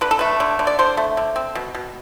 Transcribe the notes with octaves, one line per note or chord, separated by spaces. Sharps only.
D3 B4
A4
A3 B4
D3
D3
D5
D3 C5
A3
D3
C4
B2
B2